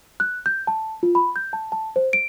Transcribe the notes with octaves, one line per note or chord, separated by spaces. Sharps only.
F#6
G6
A5
F4
B5
G6
A5
A5
C5
D7